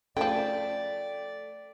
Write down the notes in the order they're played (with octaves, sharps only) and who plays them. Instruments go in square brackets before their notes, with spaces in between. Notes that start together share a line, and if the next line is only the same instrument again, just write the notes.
[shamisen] C#3 F3 [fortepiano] A3 [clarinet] D5 [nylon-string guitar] G5